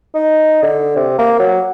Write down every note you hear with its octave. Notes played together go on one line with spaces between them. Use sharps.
D#4
D3
C3
A#3
F#3